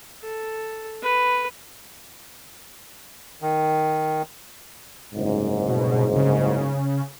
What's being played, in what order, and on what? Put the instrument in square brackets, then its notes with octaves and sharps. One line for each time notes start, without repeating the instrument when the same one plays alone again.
[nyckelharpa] A4
B4
[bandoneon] D#3
[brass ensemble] F#1 C2 G#2
[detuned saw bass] B2
C#3